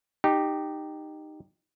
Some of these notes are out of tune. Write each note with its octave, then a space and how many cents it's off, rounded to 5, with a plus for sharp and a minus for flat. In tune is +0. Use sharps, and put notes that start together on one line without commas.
D#4 -15 G4 +0